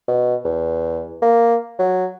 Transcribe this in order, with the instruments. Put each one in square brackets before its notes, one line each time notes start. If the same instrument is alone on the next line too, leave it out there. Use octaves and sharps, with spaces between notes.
[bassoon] B2
E2
A#3
F#3